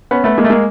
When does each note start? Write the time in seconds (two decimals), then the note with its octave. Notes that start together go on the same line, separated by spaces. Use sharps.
0.11 B3 C#4
0.24 A3 B3
0.38 G#3 A#3
0.44 A3
0.50 G#3 A#3